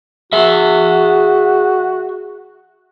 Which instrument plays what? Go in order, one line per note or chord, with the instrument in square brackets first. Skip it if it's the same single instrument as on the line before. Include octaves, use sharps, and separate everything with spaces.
[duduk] F#4 [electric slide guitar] G#4 E5